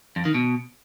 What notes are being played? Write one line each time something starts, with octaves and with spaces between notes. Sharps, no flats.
F2
D#3
B2